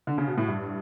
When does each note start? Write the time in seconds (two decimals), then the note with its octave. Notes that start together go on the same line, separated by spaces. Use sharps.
0.07 D3
0.18 C#3
0.27 B2
0.37 A2
0.48 G2